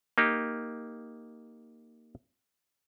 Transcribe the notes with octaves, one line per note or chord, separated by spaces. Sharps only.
A#3 D#4 G4